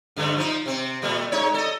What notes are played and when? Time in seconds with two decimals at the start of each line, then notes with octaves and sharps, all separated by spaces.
0.16 G2 D3 A3
0.37 F3 D#4
0.66 C3 C4
1.02 A#2 G3 A3
1.32 G#3 D#4 C#5
1.54 A4 D#5